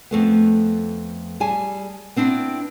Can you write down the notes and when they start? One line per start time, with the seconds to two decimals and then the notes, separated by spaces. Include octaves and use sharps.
0.11 F2 A3 B3
1.40 G3 G#4 G#5 A5
2.16 B3 C4 D4 E4